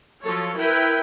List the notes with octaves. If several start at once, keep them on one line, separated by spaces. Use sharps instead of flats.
F3 F#3 A4 C#5
E4 A#4 B4 G5